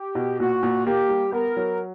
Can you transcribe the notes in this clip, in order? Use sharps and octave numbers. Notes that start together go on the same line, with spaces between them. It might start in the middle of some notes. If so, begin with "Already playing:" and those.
Already playing: G4
B2
A#2 F#4
A#2
A#3 G4
G3
B3 A#4
F#3